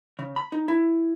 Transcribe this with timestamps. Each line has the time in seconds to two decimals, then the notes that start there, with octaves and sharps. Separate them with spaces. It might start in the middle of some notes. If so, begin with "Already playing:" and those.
0.19 C#3
0.36 B5
0.52 D#4
0.68 E4